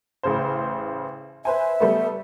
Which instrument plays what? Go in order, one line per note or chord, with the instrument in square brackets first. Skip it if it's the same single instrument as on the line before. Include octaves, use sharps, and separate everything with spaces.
[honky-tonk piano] A1 C#3 C5
[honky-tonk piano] B4 C5 G#5 [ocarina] E5
[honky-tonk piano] G3 A3 B3